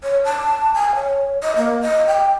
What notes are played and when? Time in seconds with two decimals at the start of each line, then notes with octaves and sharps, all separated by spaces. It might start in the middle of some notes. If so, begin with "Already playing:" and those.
0.03 C#5
0.25 A5
0.74 G#5
0.95 C#5
1.43 D#5
1.57 A#3
1.81 D#5
2.07 G5